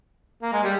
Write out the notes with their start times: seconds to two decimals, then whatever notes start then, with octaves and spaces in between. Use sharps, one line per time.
0.42 A#3
0.53 G#3
0.63 G3